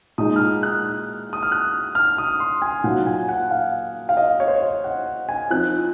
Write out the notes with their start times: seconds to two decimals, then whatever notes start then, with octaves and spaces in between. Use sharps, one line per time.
0.18 A#2 G#3 D#4 D#6
0.36 F6
0.40 D#6
0.63 F#6
1.33 D#6
1.43 F6
1.52 F#6
1.95 F6
2.18 D#6
2.40 C6
2.62 G#5
2.84 A#2 F#3 A#3 D#4 F#5
3.07 G#5
3.29 F#5
3.51 F5
4.09 F5
4.17 D#5
4.40 C#5
4.48 C5
4.55 C#5
4.63 D#5
4.84 F#5
5.29 G#5
5.50 F3 C4 D#4 F#6